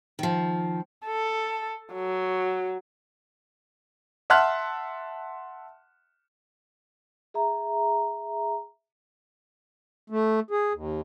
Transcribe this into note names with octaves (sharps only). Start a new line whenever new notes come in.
D#3 F3
A4
F#3
E5 F#5 A5 C6 F6 F#6
G#4 E5 A#5
A3
G#4
D#2